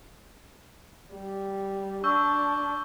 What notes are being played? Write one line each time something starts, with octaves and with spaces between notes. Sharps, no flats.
G3
D4 C#6 E6 G6